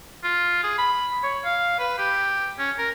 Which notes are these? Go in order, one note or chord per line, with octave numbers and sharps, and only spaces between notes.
F4
G#4
B5
C#5
F5
B4
G4
C#4
A#4